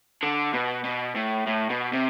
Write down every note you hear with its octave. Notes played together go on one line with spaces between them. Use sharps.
D3
B2
B2
A2
A2
B2
C3